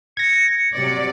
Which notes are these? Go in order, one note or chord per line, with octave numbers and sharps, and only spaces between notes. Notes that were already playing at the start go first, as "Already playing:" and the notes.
G#6 A#6 C#7
C3 F#3 D5